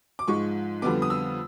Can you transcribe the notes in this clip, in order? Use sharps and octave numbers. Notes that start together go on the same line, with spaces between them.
D6
G#2 F3 G#3 C#6
F2 D3 G3 B3 D6
D#6
E6